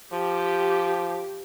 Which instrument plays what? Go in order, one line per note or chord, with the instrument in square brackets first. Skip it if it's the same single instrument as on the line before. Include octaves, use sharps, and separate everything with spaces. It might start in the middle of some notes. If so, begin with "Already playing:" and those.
[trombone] F3 [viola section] G4